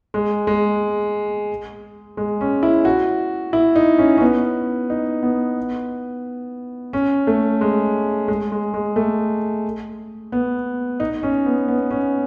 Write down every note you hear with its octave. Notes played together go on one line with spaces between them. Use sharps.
G#3
G#3
G#3
C#4
E4
F#4
E4
D#4
C#4
C#4
B3
D#4
B3
C#4
A3
G#3
G#3
G#3
G#3
A3
B3
D#4
C#4
B3
B3
C#4